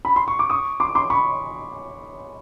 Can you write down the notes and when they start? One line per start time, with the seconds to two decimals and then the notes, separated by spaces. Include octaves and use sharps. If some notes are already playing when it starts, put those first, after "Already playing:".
0.05 B5
0.16 C6
0.28 C#6
0.39 D6
0.50 C#6 D#6
0.80 C6 D6
0.95 C6 D6
1.10 B5 C#6